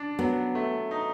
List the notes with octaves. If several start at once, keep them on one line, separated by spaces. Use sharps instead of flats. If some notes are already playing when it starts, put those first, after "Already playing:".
Already playing: D4
F#3 B3
A3
D#4